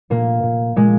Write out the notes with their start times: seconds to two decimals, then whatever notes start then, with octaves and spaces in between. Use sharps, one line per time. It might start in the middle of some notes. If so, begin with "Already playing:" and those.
0.10 A#2 A#3
0.43 A#2
0.76 A#2 G#3